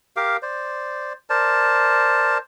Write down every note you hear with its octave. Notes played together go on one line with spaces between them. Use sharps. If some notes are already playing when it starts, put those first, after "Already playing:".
G4 A#4 F5 D6
C5 D5
A#4 C5 D5 A5